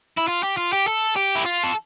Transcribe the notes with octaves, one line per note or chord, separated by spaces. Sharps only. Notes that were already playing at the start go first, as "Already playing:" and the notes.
E4
F4
G4
F4
G4
A4
G4
E4
F4
A4